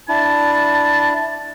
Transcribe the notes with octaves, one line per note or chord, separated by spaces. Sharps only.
D4 E4 A5